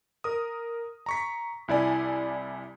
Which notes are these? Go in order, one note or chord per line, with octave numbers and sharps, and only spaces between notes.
A#4 D#6
A#5 C#6 B6
C2 E4 D5 G#5